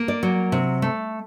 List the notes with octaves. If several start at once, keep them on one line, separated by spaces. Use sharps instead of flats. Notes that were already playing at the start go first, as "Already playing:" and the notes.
Already playing: A#3
D5
F#3
C3
A3